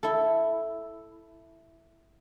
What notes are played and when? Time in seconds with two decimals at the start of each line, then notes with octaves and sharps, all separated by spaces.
0.03 E4 A4